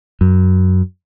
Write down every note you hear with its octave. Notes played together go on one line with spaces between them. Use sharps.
F#2